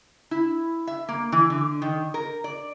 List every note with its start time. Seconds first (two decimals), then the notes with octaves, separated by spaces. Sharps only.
0.31 E4
0.87 E5
1.09 A#3
1.32 E3
1.50 D3
1.82 D#3
2.14 A#4
2.44 D5